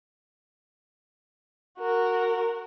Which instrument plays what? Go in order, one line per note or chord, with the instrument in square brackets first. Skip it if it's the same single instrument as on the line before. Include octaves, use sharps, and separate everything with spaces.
[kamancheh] F#4 A#4